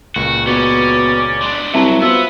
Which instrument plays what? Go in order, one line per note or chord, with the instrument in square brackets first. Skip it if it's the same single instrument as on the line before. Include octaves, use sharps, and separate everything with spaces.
[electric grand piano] C#2 A#2 [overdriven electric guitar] F#4
[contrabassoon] B2 [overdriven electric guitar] C#4 C#5 [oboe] D5
[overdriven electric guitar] G#3 D4
[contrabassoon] C2 [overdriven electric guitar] F#3 [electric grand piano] E5 A5 A#5
[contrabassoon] B2 [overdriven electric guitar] B3 [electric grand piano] F4 B4 C5 [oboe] E5